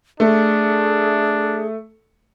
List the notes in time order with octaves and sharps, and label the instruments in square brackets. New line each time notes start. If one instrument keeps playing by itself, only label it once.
[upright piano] A3 [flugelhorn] D4 [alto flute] G#4